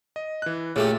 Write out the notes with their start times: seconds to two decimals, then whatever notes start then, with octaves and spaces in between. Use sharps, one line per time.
0.16 D#5
0.42 E3 F#6
0.76 A#2 C#3 A3 G4